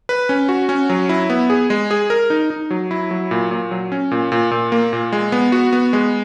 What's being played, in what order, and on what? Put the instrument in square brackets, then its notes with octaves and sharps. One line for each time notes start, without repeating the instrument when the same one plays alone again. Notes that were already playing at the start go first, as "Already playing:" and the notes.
[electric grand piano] B4
C#4
F#4
C#4
F#3
E4
B3
G#4
G#3
G#4
A#4
D#4
D#4
F#3
E4
F#3
A#2
A#2
F#3
C#4
A#2
A#2
A#2
A#3
A#2
G#3
B3
F#4
B3
G#3